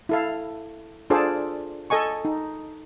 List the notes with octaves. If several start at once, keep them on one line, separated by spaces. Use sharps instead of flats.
E4 A4 F5
D4 F4 G#4 A4 C5 D5
A4 D#5 G#5 C#6
D#4